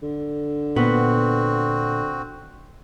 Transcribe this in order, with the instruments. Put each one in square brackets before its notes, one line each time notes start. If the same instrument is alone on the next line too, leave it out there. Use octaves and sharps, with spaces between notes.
[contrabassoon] D3
[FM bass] A#2 [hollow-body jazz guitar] B3 [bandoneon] C4 F#4